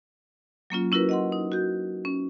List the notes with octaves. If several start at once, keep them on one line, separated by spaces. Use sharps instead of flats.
F#3 A#3 C#4 F4
C#4 E4 F#4 A#4 B4
D#5 F#5 C6
D#4
F#4 G6
C#4